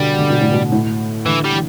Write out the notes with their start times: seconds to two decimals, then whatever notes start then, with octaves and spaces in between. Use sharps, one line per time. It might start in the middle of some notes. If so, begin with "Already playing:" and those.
Already playing: B2 D3 G3
0.19 D3
0.30 B2
0.41 A2
0.52 B2
0.72 A2
1.26 D3 E3
1.45 G3
1.53 E3